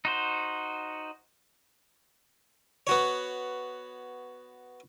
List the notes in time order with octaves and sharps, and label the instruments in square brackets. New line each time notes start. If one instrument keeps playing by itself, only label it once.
[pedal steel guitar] D#4 F#4 C5
[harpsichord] B3 F#4 C#5